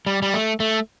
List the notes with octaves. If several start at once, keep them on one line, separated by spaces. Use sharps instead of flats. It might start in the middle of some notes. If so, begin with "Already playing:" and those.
G3
G3
A3
A3